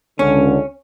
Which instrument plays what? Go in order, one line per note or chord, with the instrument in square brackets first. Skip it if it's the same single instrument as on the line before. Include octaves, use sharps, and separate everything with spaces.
[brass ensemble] C#2 D3 [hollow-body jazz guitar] C#4